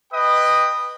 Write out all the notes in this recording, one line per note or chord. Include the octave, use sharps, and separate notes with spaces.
B4 D#5 G5 D#6